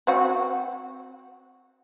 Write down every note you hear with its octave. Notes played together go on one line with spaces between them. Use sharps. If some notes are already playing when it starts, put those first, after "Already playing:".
C4 F#4